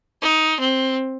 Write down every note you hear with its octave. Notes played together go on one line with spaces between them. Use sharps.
D#4
C4